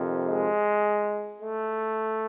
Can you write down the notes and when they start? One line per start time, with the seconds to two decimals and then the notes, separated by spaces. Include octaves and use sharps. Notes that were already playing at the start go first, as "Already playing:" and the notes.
Already playing: F2 C3 D#3
0.25 G#3
1.42 A3